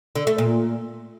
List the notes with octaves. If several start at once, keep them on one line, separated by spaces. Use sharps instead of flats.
D3
A3
A#2